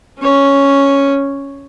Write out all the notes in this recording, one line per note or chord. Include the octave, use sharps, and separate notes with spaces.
C#4 C#5